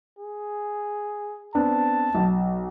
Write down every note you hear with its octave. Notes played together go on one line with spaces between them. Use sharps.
G#4
B3 C4 D4 A5
B1